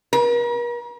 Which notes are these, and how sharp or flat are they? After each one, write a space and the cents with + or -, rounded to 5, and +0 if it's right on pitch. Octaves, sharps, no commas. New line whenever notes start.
A#4 +45